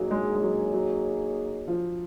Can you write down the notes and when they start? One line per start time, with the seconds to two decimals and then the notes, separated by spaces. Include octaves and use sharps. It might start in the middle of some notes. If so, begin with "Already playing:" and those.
Already playing: F#3 A#3 D#4 G#4 C#5
0.11 G#3
0.35 G#3
0.42 F#3
0.73 F#3
1.68 F3